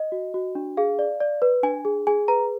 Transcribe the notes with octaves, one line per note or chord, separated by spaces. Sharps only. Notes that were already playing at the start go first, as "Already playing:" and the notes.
Already playing: D#5
F#4
F#4
D4
G#4 F5
D5
D5
B4
D4 G#5
G#4
G#4 G#5
B4 A#5